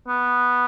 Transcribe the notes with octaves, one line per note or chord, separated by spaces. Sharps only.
B3